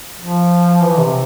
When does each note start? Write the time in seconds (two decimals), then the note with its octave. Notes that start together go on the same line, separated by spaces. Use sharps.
0.21 F3
0.83 E3
0.98 C3